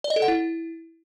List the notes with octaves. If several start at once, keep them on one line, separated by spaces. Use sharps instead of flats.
D5
D#5
A4
F#5
E4